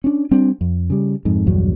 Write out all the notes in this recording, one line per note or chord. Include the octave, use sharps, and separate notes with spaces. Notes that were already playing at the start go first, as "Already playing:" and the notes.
C#4 D4
G3 C4 D4
F2
C#3 G3
F2 G#2
A#1 E2 G2 F#3